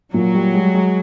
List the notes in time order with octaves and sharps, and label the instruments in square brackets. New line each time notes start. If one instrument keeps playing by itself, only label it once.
[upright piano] A#2 [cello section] F#3
[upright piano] G3
G#3
G#3